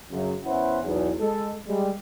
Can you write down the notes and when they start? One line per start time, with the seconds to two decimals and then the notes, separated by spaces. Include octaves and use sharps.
0.12 F#2 C#3
0.45 E2 E3 C#4 E4 C5 F#5
0.84 B1 E2
1.20 G#3 A4
1.68 G3 G#3